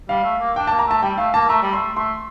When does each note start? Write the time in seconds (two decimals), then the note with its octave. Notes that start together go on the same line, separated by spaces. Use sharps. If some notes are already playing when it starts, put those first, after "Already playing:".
0.09 G3 F5
0.24 A3
0.40 A#3
0.56 D4 G5
0.67 A#3 A5
0.79 A#5
0.87 A3 A5
1.02 G3 G5
1.18 A3 F5
1.34 A#3 A5
1.49 A3 A#5
1.63 G3
1.73 A3 C6
1.96 A3 C6